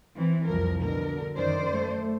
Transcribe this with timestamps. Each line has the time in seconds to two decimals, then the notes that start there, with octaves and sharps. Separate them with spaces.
0.15 E3 C4
0.46 C2 F2 F3 A#4
0.82 B2 D3 A#4
1.34 F#2 D#3 C5 D5
1.71 A3